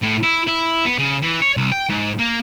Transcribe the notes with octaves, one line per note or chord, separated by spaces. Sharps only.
A2
E4
E4
B3
C#3
E3
C#5
C2
G5
G#2
A#3